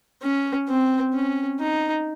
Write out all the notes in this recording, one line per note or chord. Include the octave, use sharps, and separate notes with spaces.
C#4
C4
C#4
D#4